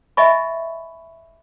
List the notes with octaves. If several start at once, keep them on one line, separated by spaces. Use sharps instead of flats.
D#5 E5 G#5 B5 C#6